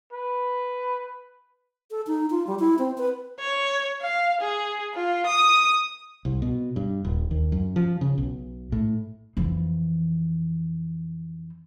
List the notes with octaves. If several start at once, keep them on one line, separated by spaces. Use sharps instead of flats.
B4
A4
D#4
F4
G3
E4
C4
B4
C#5
F5
G#4
F4
D#6
C2
B2
G2
D#1
D#2
F#2
F3
C#3
B1
A2
F2 E3